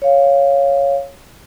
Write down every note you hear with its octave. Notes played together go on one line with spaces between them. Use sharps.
C#5 F5